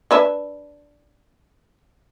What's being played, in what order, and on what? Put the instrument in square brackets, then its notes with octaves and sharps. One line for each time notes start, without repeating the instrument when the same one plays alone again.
[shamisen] D4 B4 E5